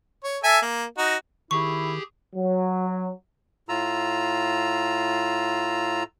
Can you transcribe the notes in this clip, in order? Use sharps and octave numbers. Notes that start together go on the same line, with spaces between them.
C#5
A4 E5 G#5
A#3
D#4 F#4
D#3 E4 G4 G#4 C#6
F#3
A2 F4 A#5 E6